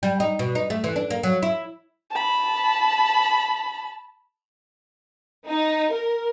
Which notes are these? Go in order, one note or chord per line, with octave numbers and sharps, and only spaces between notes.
G3
D#4
B2
D#4
A3
E3
D4
A#3
F#3
E4
A5 B5
D#4
A#4